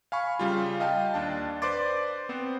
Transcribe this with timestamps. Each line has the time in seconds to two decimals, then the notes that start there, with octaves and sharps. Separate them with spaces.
0.12 F5 G#5 B5 C#6
0.39 C#3 G3 F4
0.80 D#5 F5 G5 A5
1.14 D#2 D4 A5
1.62 B4 C5 D5 C6 D6 A6
2.29 B3 C4 C5